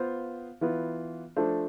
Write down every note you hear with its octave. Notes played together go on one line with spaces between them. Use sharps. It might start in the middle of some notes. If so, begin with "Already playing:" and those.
Already playing: B3 F4 C5 F5
E3 B3 F4
F3 A3 D4 A4 C5